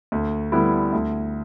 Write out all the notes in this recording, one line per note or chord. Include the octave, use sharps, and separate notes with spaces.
D2
D3 G3 B3 E4
D2